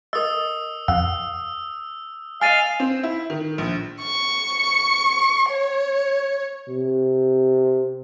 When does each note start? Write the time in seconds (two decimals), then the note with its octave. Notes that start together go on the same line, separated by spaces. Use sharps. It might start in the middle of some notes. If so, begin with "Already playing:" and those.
0.13 A#4 D#5 D#6 E6
0.88 F2 F5 F#5 E6
2.41 D#5 F5 G#5 F6 A6 D#7
2.80 C4
3.03 E4
3.30 D#3
3.58 A#1
4.01 C#6
5.50 C#5
6.68 C3